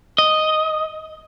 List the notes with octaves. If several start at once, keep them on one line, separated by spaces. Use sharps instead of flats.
D#5